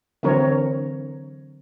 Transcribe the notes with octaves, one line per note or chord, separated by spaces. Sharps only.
D3 E3 F#3 C4 A#4 C#5